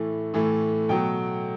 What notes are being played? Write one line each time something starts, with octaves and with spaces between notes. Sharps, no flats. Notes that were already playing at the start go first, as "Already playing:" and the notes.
Already playing: A2 E3 A3
A2 E3 A3
B2 F#3 A3 G5